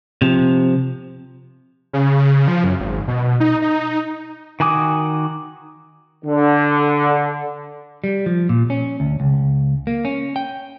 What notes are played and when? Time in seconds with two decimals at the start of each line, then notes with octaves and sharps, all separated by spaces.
0.22 C3 F3
1.93 C#3
2.18 C#3
2.48 F3
2.64 F#2
2.80 G#1
3.08 B2
3.40 D#4
3.62 D#4
4.60 D#3 F#4 G#5 D6 D#6
6.25 D3
8.04 G3
8.26 F3
8.49 A#2
8.70 C#4
9.00 D2
9.20 C#2
9.87 A#3
10.05 C#4
10.36 G5